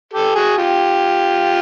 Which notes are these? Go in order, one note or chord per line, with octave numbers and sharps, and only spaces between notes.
G4 A4
F#4 G#4
F4 G4